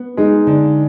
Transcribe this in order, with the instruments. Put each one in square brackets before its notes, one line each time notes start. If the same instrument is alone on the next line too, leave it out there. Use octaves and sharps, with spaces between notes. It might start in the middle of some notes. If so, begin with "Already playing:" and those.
Already playing: [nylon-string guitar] B3
[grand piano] G#3 [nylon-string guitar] D#4
[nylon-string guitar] D3